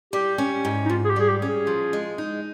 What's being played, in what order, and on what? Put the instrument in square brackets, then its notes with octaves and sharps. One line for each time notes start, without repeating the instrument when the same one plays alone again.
[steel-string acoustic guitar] G3 [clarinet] G4
[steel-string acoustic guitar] C#4
G#2
[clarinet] D#4
[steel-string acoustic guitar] G#2 [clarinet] F4
[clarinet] G#4
G4
[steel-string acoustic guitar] G3 [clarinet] G#4
[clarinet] G4
[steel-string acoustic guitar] C#4
[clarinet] G#4
[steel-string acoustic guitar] F3
G#3
D#4